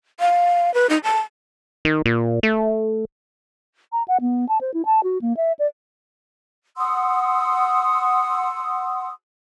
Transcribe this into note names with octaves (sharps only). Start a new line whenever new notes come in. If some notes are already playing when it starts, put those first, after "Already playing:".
F5
B4
D#4
A5
D#3
A#2
A3
A#5
F#5
B3
A5
C5
E4
A5
F#4
A#3
E5
D5
F#5 C6 D#6 E6